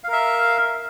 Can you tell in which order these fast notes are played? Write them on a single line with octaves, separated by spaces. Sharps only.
F5 A#4 E5